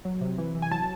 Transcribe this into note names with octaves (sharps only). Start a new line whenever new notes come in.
F#3
C3
E3
E3
G#5
F#3 A5